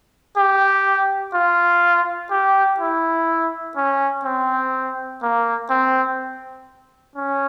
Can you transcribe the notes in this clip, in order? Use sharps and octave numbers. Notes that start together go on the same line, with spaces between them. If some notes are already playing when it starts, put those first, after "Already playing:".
G4
F4
G4
E4
C#4
C4
A#3
C4
C#4